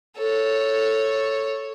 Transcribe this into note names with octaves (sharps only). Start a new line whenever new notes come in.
A4 C#5